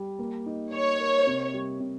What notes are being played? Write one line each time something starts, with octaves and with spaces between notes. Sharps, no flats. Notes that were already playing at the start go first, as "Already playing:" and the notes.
Already playing: G3
A#3
D#4
C#5 D#5
A#4
C3
G3
C3